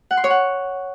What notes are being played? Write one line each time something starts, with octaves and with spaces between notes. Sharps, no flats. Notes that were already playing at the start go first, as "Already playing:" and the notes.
F#5
C6
C#5
F#5